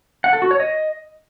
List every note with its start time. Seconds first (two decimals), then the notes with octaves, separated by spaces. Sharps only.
0.24 F#5
0.33 A4
0.42 F#4
0.51 C#5
0.60 D#5